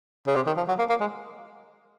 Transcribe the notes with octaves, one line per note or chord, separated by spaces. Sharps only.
C#3
C3
D#3
F3
F#3
A#3
A#3
G#3